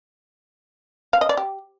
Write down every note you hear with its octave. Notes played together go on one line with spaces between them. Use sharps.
F5
D#5
D5
G4